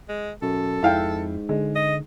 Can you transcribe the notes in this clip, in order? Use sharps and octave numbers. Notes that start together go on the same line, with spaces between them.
G#3
B1 F#2 A4
F2 G#2 E4 F5 G5
D3 G#3
D#5